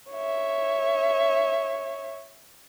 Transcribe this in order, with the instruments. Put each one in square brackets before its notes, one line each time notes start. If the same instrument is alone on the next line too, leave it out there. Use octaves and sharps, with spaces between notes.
[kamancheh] C#5 E5